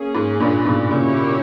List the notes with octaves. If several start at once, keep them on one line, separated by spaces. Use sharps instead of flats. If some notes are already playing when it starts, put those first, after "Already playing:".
Already playing: A#3 C#4 G#4
G#2
G2 A#2
G#2 B2
A#2 C#3 A#3 E4 G4 C#5